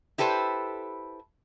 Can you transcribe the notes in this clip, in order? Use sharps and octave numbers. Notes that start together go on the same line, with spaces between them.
E4 G4 A4 B4 C5